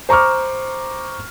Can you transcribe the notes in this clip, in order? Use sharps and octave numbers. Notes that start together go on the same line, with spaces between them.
C5 A#5 C#6 D6 F6